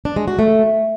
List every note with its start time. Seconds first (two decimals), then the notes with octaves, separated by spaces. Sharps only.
0.05 D4
0.16 G#3
0.28 F#4
0.39 A3